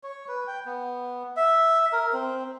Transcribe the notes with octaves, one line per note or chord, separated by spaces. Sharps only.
C#5
B4
G5
B3
E5
A#4
C4